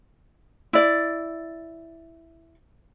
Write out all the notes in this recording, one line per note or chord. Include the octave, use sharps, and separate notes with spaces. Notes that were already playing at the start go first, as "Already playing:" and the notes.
E4 D5